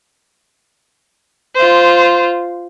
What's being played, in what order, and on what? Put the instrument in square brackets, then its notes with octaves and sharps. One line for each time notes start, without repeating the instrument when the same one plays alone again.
[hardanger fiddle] F4 C5